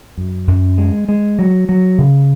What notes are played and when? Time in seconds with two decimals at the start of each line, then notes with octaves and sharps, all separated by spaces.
0.17 F#2
0.47 F#2
0.78 G#3
1.09 G#3
1.39 F#3
1.69 F#3
1.98 C#3